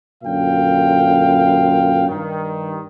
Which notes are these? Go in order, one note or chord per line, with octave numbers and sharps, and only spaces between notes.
F#2 A#2 D3 F5 G5
G2 D#3